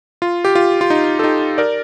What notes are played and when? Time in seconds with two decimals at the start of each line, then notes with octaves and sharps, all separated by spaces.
0.22 F4
0.45 G4
0.55 F4
0.81 F4
0.90 D#4
1.19 A4
1.24 D#4 G4
1.58 A#4 D5